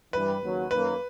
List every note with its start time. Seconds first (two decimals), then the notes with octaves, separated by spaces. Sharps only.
0.13 G2 E3 G3 B4
0.42 D#2 C#3 F#3
0.71 F#2 D#3 F#3 A#3 B4